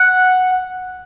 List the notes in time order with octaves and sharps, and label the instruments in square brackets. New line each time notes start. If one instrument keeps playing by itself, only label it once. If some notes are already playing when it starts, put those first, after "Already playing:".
Already playing: [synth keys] F#5